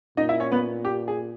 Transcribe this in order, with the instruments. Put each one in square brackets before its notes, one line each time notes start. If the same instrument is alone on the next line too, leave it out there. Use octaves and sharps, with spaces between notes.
[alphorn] A#2 [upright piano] D#4 D#5
[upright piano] E4 E5
C#4 C#5
B3 B4
G4
G#4